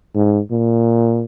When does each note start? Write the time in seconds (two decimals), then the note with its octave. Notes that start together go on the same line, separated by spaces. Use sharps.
0.15 G#2
0.51 A#2